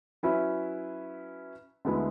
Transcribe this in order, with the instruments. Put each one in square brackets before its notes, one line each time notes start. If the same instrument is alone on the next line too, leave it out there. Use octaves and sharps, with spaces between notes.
[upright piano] F#3 C#4 E4 B4 E5
D2 D3 G#3 B3 E4